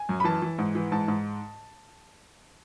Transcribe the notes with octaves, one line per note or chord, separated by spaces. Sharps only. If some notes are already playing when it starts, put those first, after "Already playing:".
Already playing: G#5
F#2
B5
E3 A5
E3
G#2
E3
G#2 A5
G#2